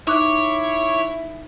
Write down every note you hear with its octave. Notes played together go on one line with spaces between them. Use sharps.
D#4 E4 C#5 D6 F#6